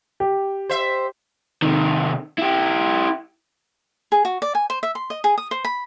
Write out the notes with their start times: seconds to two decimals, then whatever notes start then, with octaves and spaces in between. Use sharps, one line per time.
0.20 G4
0.69 C5 E5
1.62 C3 D#3
2.39 E4 G4
4.12 G#4
4.25 F#4
4.42 D5
4.55 G#5
4.70 C5
4.83 E5
4.95 C6
5.10 D#5
5.24 G#4
5.38 D#6
5.51 C5
5.65 B5